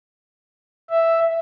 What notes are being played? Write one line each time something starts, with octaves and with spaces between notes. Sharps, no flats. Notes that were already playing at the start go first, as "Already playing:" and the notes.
E5